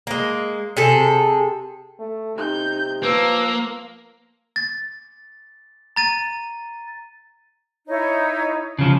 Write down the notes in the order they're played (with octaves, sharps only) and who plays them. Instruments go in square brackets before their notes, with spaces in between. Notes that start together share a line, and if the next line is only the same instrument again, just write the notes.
[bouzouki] G#3 A#3
C3 G#4 A4
[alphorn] A3
[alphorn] C3 [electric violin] D#4 G6
[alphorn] F3 [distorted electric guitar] A#3 [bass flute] B4 [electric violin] E6
[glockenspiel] A6
A#5 A6 D#7
[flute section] D#4 E4 C#5
[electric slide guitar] C#3 F3